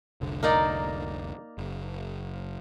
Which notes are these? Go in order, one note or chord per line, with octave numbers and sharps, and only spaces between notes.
F1 C2 D3
A#3 D#4 D5 A#5
F#1